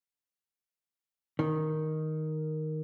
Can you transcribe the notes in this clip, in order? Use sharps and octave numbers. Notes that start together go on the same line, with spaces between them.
D#3